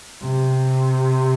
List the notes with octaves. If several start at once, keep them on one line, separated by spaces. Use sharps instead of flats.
C3